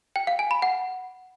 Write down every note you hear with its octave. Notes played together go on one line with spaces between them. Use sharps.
G5
F5
G#5
B5
F#5